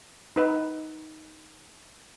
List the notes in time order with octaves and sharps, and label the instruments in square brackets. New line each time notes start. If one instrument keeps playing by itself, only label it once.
[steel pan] D#4 B4